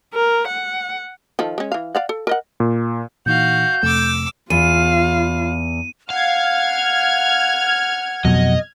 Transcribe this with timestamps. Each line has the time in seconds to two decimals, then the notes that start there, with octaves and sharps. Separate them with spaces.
0.14 A#4
0.48 F#5
1.39 D#3 F3 A4
1.58 G#3 C#4
1.72 E3 F5
1.95 D5 F5 F#5
2.09 A4
2.27 A#4 D#5 F#5
2.60 A#2
3.26 A#2 E3 D#4 F#4 F5 G6
3.83 F2 C3 A3 D6 E6
4.50 E2 F4 F5 D#7
6.10 F5 F#5 F6 G#6
8.25 F2 B2 F#3 D#5